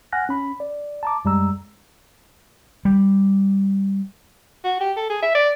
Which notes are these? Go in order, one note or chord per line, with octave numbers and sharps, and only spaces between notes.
F#5 G#5 F6 F#6 A#6
C#4 B5
D5
A5 A#5 D6
F#2 G3 G#3 A#5 E6
G3
F#4
G4
A4
G#4
E5
D5